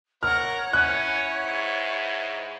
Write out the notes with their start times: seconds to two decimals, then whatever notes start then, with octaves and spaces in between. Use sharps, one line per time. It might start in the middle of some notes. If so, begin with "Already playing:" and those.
0.23 A#4 C#5 F#5 A#5 F6
0.73 C#4 E4 F#5 F#6
1.45 G#2